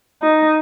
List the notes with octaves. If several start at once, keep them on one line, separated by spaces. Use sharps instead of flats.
D#4